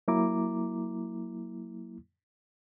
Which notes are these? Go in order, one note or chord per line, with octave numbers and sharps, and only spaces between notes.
F#3 A#3 E4 A#5 D6